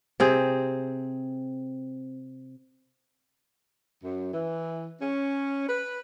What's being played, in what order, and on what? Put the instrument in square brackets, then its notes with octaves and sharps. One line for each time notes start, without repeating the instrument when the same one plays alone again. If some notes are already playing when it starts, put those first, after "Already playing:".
[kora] C3 C4 G#4
[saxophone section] F#2
E3
C#4
B4